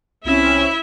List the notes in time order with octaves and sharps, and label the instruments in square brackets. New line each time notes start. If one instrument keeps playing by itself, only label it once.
[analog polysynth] C2 C4 C#4 [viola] E4 E5